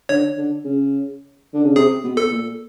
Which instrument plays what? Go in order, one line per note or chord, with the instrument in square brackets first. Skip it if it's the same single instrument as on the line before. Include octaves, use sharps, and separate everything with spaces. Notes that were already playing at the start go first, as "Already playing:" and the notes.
[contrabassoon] D3 [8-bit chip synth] C#5
[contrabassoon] D3
C#3
D3
C#3
[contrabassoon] C3 [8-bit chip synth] G#4
[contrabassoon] B2
[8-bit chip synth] A4
[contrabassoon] A#2